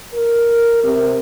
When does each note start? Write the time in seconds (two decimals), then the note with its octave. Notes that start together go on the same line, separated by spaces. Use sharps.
0.14 A#4
0.84 C3